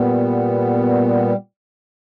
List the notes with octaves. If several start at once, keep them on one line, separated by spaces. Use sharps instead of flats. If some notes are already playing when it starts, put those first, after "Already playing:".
Already playing: A#2 G3 B3